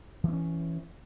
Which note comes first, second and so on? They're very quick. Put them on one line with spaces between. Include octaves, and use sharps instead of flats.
E3 C4 C#4